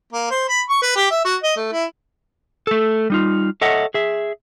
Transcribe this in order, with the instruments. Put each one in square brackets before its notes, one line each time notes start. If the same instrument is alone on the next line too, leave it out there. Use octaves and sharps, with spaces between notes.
[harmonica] A#3
C5
B5
C#6
B4
G4
E5
F#4
D#5
A3
E4
[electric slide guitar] A3 A4
G3 D#4 F4
A4 C#5 D#5 E5 F#5
G#4 E5